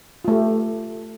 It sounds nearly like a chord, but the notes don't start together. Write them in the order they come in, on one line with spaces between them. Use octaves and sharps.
F4 A3 G4